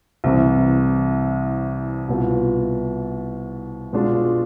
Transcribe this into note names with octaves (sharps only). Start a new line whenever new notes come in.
C2 C3 E3
C2 B2 B3 F4
B2 G#3 D4 F4